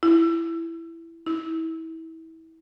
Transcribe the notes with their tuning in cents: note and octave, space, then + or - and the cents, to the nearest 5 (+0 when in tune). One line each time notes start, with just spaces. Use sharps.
E4 +10
E4 -30